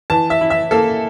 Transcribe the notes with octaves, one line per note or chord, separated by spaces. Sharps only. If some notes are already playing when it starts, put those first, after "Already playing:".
E3 A5
E5
E4
E5
A#3 A4